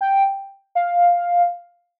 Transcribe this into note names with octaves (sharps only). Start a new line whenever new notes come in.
G5
F5